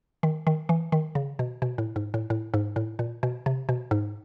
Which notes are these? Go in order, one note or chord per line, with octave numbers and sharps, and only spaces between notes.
D#3
D#3
E3
D#3
C#3
B2
B2
A2
G#2
A2
A2
G#2
A2
A#2
B2
C3
B2
G#2